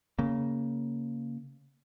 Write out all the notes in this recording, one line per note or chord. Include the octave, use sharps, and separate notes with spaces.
C#3 A#3